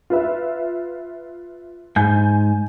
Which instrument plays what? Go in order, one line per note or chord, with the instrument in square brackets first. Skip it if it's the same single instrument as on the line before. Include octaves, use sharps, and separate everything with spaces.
[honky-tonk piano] F4 B4 E5
[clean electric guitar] G#2 [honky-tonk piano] G#5 G6